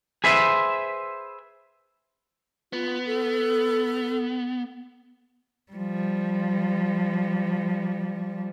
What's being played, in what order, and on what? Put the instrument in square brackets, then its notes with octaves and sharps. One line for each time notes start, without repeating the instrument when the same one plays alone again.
[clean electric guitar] G#4 B4 C5 E5
[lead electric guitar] B3 [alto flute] F4
[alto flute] A4
[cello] F3 G3